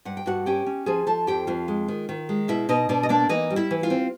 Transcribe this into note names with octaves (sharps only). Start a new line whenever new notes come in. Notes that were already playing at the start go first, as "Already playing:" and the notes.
G2 F#5
G5
G2 F#4 F#5
C#4 G4 G5
C#4
F3 G#4 G#5
F3 A4 A5
F2 G4 G5
F2 F4 F5
G#3
D#3
D#3
G#3
B2 E4 E5
B2 D#4 D#5
B2 D4 D5
D#5
A#3 D4 D5
E3 D#4 D#5
G3
E4 E5
E3
F4 F5
C4